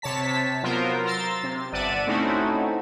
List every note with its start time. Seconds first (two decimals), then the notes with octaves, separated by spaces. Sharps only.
0.02 C3 C#5 A5 B6
0.63 F#3 B3 F4 A#4 C5
1.04 A#5 C6 E6 A6
1.43 C3
1.73 G1 D5 E5 F#5 A5 D#7
2.06 A3 C4 C#4 D#4 E4 F#4